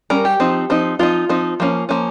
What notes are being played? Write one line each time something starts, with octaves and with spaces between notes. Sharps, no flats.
G3 C#4 A#4
G4
F3 C4 D#4
F3 C4 D#4
F3 C4 D#4 F4
F3 C4 D#4
F3 A#3 C#4
F3 A#3 C#4